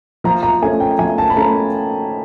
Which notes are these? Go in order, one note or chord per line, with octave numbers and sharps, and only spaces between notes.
F3 A#5
A#5
A3 C#4 G#5
G5
F3 G#5
A5
B5
A3 C#4 A#5